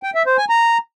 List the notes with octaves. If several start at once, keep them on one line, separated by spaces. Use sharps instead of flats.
G5
E5
C5
G#5
A#5